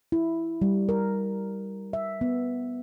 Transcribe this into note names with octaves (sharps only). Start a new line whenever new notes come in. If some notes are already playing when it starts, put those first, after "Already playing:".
E4
G3
A#4
E5
B3